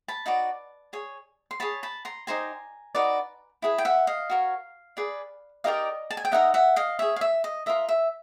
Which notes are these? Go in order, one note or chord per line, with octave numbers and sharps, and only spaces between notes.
A5 B5
D#4 F#4 B4 D5
G#4 C#5
C6
G#4 C#5 A5 B5
A5 B5
A#5 C6
D#4 G4 C5 G#5 A#5
D#4 F#4 B4 D5
E4 G#4 B4
G5
E5 F#5
D#5 F5
F#4 A#4 C#5
G#4 B4 D5
D#4 G4 A#4 D5 D#5 F5
A5
G#5
G5
D#4 G4 A#4 D#5 E5 F#5
E5 F#5
D#5 F5
G#4 C#5 E5
F5
E5
D#5
F4 A#4 D#5 E5
E5